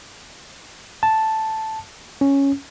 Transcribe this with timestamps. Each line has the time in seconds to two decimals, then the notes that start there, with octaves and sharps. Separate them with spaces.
1.03 A5
2.21 C#4